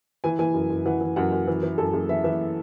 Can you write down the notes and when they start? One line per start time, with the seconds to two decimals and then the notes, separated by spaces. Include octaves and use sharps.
0.24 E3 G#5
0.39 E3 G#5
0.54 F#2
0.70 F#2
0.86 E3 F#5
1.01 E3
1.16 F#2 F#5
1.32 F#2
1.48 E3
1.63 E3
1.78 F#2 A4
1.93 F#2 G#4
2.09 E3 E5
2.24 E3 E5